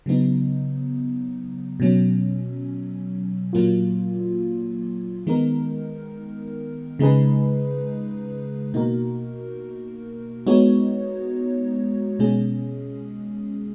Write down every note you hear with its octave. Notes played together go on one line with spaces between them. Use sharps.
C#3 F#3 B3 D#4
B2 F#3 C#4
A#2 F#3 A#3 F4
D#3 G#3 B3 D#4 A#4
C#3 G#3 D#4 G#4 B4
B2 A#3 D#4 F#4 A#4
G#3 B3 D#4 F#4 C#5
B2 G#3 C#4 G#4